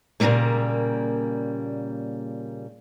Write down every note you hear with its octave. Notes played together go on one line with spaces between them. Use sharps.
A#2 C#3 E3 G3 A3 A#3